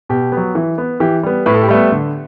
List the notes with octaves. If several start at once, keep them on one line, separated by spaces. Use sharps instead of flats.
B2 G4
F#3 B3
E3
B3
E3 G4
G3 B3
A2 B4
A4
G4
G3 A3 B3 A4
D3